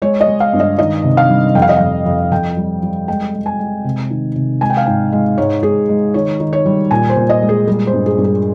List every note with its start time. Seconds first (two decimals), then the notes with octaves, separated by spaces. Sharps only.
0.02 G#3 C#5
0.21 D#5
0.27 G#3
0.40 F5
0.53 G2
0.60 D#5
0.78 D#3 D#5
1.04 C3
1.17 F5
1.30 G3
1.55 F2 G5
1.62 F5
1.69 D#5
1.76 F2 F5
2.06 F2
2.32 F2 G5
2.57 G3
2.83 G3
3.08 G#3 G5
3.34 G#3
3.46 G#5
3.59 G#3
3.84 C3
4.10 D#3
4.36 C3
4.61 G#3 G#5
4.70 G5
4.77 F5
4.86 G#2 G5
5.12 G#3
5.38 G#2 C#5
5.63 G#2 G#4
5.89 G#3
6.14 D#3 C#5
6.40 D#3
6.53 C#5
6.66 G3
6.91 A#2 G#5
7.10 C5
7.16 A#2
7.29 D#5
7.42 G#3
7.49 G#4
7.67 G3 G#4
7.87 C5
7.93 G2
8.06 G#4
8.18 G2
8.24 G#4